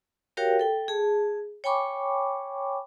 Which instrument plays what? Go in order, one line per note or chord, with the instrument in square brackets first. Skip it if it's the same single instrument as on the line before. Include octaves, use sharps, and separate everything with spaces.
[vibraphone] F#4 G4 A#4 C#5 F5 G5
A4 G5
G#4 A5
C#5 G5 G#5 B5 C#6 D6